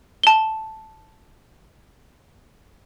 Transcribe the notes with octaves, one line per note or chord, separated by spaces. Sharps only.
A5 G7